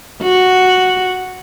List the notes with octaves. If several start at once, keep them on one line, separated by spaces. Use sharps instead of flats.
F#4